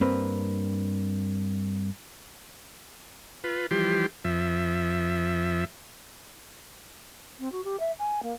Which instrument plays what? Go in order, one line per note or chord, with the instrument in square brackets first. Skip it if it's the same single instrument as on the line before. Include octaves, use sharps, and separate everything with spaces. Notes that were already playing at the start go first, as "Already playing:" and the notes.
[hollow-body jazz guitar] G2 A#3 C4 B4
[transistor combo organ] F4 B4
E3 F3 G3 G4 C6
F2 F3 E5
[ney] C4
F#4
G4
E5
G#5
A#3